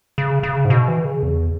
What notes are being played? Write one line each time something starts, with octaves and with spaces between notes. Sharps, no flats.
C#3
C#3
G#2
B2
E3
C#3
E2